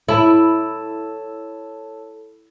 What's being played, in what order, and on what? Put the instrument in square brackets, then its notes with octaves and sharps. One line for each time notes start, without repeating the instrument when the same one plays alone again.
[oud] E4 [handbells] A4 C#5 A5